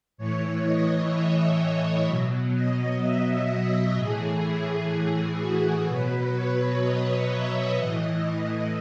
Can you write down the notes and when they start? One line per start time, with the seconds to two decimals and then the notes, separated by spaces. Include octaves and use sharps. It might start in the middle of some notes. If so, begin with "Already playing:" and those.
0.18 A2 E3 C#5
0.64 D#5
1.12 E5
2.08 B2 F#3
2.54 D#5
3.02 E5
3.50 D#5
3.97 A2 E3 G#4
4.92 G#4
5.40 F#4
5.86 B2 F#3 B4
6.34 C#5
6.82 D#5
7.30 E5
7.77 A2 E3 D#5